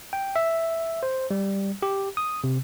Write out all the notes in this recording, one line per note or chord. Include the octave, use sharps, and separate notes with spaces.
G5
E5
C5
G3
G4
D#6
C3